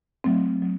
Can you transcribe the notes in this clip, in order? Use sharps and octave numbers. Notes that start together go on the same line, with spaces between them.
F#3 A3 C4
F#3